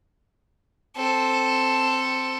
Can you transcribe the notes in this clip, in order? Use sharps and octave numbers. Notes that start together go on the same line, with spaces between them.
C4 A4